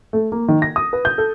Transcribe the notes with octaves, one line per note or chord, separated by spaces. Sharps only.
A3
A#3
D#3
A#6
D#6
B4
G6
A4